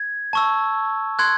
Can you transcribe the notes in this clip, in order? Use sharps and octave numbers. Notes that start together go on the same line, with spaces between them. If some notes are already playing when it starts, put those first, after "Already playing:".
Already playing: G#6
A5 C#6 E6
C6 F#6 G#6